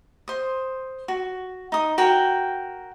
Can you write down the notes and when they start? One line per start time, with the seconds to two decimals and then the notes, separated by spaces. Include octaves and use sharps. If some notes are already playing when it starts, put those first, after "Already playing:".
0.28 C5 D#6
1.08 F#4
1.72 D#4 D#6
1.98 F#4 A#4 G5